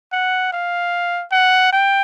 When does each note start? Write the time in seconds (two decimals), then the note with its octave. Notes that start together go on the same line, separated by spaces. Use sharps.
0.12 F#5
0.53 F5
1.32 F#5
1.73 G5